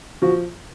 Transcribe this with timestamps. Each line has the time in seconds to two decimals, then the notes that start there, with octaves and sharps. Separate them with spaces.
0.22 F3 F#4